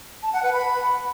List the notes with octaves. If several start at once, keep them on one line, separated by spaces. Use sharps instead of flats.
A5
F#5
B4
B5